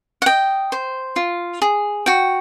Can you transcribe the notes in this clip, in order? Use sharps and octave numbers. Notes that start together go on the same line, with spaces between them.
F#5
D#5 G5
C5
F4
G#4
F#4 G5